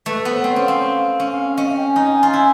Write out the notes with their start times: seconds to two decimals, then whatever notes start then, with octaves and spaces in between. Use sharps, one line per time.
0.06 A3 B4
0.19 B4
0.25 B3
0.31 C5
0.44 C4 C#5
0.56 C#4
0.63 C4 F5
0.82 F5
1.20 C#4
1.57 C#4 D#5
1.67 F5
1.77 G5
1.86 G#5
1.96 D#4
2.23 F4
2.33 E4 G#5